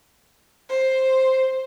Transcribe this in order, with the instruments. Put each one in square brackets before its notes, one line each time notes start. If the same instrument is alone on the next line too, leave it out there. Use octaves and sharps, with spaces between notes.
[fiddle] C5